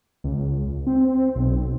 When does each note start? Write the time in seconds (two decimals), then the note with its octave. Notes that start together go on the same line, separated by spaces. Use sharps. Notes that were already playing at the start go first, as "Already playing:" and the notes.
0.24 C#2
0.87 C4
1.36 B1